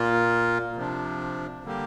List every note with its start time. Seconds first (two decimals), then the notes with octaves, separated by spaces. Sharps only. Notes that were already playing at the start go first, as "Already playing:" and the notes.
Already playing: A#2 A#3 F4
0.76 C3 F3 D4
1.65 D3 G3 A#3 G4